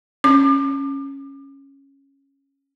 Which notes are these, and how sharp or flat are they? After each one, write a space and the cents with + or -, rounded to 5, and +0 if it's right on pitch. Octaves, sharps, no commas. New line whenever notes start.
C#4 -10 D6 +35